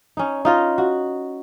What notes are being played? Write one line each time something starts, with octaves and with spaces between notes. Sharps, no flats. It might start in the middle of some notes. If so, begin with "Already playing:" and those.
C#4 D#4
D#4 F4 D#5
F#4